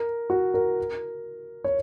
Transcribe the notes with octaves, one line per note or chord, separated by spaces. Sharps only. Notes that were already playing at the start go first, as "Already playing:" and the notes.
Already playing: A#4
F#4
A#4
C#5